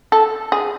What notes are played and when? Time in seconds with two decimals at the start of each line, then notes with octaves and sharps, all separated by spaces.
0.12 A4
0.52 G#4